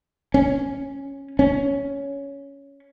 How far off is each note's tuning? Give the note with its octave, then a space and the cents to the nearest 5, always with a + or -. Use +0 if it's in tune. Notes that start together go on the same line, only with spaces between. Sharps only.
C#4 -5
C#4 +10